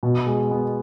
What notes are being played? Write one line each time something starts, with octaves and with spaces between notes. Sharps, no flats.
B2
G#3
B3